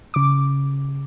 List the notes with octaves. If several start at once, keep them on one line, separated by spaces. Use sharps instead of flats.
C#3 D6